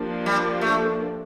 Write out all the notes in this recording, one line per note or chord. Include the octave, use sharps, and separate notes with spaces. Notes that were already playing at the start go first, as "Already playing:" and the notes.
Already playing: F3 A#3 D4 G4
G3
A3